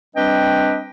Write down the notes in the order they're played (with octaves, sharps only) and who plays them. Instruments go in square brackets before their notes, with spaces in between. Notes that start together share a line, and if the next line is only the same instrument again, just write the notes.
[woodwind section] G3 C4 D4 B4 D#5 G5